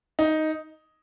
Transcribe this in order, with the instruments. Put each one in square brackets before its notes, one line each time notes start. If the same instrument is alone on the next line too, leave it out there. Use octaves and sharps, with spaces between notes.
[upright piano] D#4